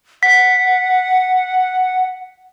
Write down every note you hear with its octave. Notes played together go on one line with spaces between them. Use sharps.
F#5 B6